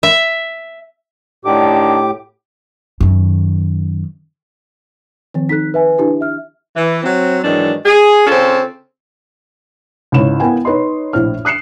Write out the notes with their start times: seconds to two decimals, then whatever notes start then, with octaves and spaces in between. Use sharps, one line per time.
0.03 E5
1.45 A2 D3 D#3 D4 G4 D6
3.00 F#2 D#3
5.34 D#3 F3 C4
5.49 D#4 A4 F#6 B6
5.74 B4 E5 G#5
5.98 D4 E4 G4
6.21 E5 F6
6.76 E3
7.04 F#3 C4
7.43 G#2 D#3 E3 F#3 D4
7.86 G#4
8.27 C#3 C4 C#4 F4 A4
10.12 C#2 G#2 E4 C#5 E7
10.40 A#3 B3 E4 G5 G#5
10.65 D#4 B4 C#5 D#5 C6
11.13 A#1 A2 C5 F6
11.45 D#6 F#6 C7 C#7 E7